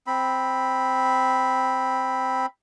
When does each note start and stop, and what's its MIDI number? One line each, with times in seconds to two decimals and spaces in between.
0.07 2.46 60
0.07 2.46 83